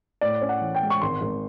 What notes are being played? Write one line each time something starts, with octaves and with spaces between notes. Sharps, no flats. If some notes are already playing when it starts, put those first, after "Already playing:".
A2 D5
C#4
F#5
E3
G5
G#3
C#6
G#1 C6
G#1